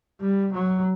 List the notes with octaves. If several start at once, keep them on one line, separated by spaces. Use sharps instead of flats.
G3
F#3